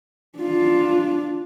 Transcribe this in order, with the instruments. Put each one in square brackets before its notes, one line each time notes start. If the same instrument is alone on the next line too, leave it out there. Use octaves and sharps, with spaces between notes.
[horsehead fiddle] D4 F4